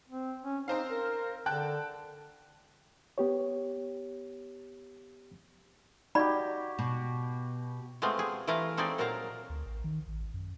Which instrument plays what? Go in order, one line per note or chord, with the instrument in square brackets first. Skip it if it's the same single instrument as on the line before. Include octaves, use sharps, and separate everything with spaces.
[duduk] C4
C#4
[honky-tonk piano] C4 C5 F5 [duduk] D#4
[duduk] A#4
[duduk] D3 [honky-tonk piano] G5 A5 F#6
[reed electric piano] B3 G4 C#5
[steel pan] D#4 [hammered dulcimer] F#4 G4 [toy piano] D5 B5
[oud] B2
[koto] G#3 A3 B3 C4 F4
G4 G#4
E3 A3 E4 F4 F5 A#5
A3 C4 D#4 E4 G#4 D5
A#2 F#3 A#4 C5 F5 A#5
[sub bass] D2
A1
D#3
A1
G#1
F#2